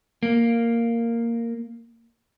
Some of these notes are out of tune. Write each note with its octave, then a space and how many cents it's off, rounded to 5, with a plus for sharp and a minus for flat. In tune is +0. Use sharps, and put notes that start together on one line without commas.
A#3 -5